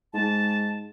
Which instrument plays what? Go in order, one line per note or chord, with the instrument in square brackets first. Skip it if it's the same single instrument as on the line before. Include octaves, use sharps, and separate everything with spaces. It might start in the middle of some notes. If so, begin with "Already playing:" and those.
[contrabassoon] G#2 [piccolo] A5